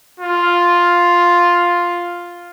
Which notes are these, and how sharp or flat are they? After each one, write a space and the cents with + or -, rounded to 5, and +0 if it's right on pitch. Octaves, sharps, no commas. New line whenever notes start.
F4 +5